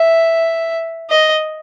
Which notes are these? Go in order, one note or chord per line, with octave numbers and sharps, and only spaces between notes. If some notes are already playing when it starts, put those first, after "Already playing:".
Already playing: E5
D#5